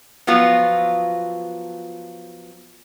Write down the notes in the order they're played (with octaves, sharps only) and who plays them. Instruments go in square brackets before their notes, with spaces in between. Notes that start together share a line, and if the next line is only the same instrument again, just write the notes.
[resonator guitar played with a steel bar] F3 F#3 B3 F4